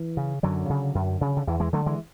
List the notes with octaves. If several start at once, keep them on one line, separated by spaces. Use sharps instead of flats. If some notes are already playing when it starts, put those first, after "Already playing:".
Already playing: E3
C#3
F#2 D3 F#3
C#3
F#2
C#3
D3
E2 E3
E3 G#3
D3 F#3 A3
E3 G#3